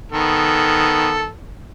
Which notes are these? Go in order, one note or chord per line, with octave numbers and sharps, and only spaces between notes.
D#3 B3 A4